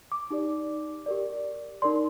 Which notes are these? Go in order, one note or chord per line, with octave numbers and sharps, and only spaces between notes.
D6
D#4 G4 D5
G4 A#4 D5
D#4 A#4 D5 C6